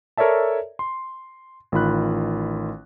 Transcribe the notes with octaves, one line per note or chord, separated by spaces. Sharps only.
A4 A#4 C#5 D5 E5 A5
C6
A1 D#3 F4 B5 F#6